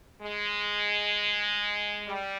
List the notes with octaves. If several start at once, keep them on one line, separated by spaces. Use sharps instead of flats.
G#3
G3